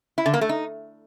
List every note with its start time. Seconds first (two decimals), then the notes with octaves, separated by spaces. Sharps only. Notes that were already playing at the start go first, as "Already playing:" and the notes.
0.18 E4
0.26 D3
0.34 A#3
0.41 A3
0.49 D#4